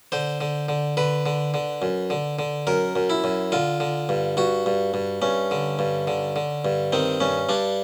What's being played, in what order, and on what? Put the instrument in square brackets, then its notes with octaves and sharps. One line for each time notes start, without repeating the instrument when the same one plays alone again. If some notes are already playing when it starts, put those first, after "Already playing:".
[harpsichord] D3 C5
D3
D3
D3 B4
D3
D3
F#2
D3
D3
F#2 A#4
F#2
E4
F#2
D3 F4
D3
G2
G2 F#4
G2
G2
G2 C#4
D3
G2
D3
D3
G2
D#3 C4
G2 C#4
G2 D4